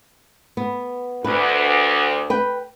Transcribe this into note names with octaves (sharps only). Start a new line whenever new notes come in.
B3
D2 B4
B4 G5